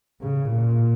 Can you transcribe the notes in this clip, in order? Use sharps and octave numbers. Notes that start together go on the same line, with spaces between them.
C#3
A#2